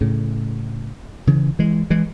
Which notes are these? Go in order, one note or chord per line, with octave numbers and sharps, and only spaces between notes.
A2 C#3
C#3 E3
E3 G#3
E3 G#3